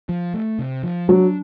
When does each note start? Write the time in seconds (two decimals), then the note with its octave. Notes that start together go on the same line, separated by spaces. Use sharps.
0.09 F3
0.34 A3
0.59 C3
0.84 F3
1.08 F#3 D4